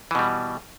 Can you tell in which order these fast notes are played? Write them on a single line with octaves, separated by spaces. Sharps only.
E3 B2 G3